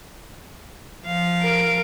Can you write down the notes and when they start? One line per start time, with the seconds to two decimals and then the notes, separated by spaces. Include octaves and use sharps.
1.05 F3 F5
1.40 A#4 D7